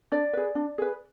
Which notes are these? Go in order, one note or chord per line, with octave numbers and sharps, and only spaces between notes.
D4 D5
G#4 B4
D4
G#4 B4